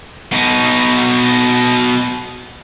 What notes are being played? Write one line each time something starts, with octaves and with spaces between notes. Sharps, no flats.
B2 D#4